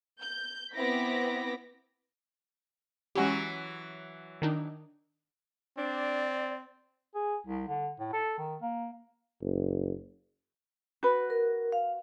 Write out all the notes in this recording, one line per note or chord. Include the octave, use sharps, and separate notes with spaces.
G6
B3 C4 E4 D6 A#6 B6
E3 F#3 G#3 C#4 F#4 G4
D#3 D4 D#4
C4 D4 D5
G#4
C2
D3
A2
A4
D#3
A#3
F#1
F#4 B4
A#4
F5